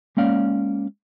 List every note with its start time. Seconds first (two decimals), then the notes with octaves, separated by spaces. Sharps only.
0.17 G#3 A#3 C#4 D5 F5